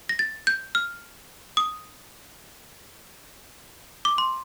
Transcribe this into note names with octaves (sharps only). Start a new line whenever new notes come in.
A#6
A6
G6
F6
D#6
D6
C6